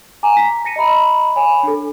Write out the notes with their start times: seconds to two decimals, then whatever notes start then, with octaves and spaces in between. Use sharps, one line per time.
0.23 G#5 A#5 D6
0.37 A#5 B6
0.65 A5 A#6 C#7 D#7
0.76 D#5 E5 A#5 B5
1.36 C#5 G#5 B5
1.63 D4 A4